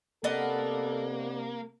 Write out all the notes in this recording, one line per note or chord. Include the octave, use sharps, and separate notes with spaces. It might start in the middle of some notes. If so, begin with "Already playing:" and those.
C3 A#3 B3 D4 A4 D#5